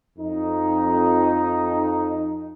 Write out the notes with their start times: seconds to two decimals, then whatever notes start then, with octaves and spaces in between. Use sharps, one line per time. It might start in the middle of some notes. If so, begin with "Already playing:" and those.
0.18 F2 D#4